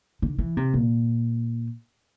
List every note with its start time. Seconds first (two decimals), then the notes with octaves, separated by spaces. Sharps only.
0.22 D3
0.38 E3
0.57 C3
0.74 A#2